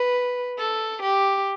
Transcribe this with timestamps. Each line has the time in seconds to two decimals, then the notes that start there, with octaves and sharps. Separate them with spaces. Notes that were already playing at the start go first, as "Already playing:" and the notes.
Already playing: B4
0.58 A4
1.02 G4